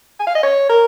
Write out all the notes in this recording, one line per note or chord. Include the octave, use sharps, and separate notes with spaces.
G#5
F5
D#5
C#5
A#4